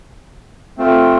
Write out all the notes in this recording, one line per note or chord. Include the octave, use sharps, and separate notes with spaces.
A3 C4 F4